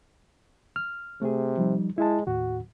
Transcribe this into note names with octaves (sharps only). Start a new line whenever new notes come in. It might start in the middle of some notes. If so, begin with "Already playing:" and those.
F6
C3 A3 G#4
F3 G3 D#4
G#3 E4 A5
D#2 A2 F#4